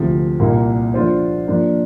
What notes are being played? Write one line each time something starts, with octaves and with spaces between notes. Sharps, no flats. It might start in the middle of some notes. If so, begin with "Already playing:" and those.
Already playing: D2 C3 F3
C2 A#2 A#3
F3 D4 F4 C5
F3 A#3 D4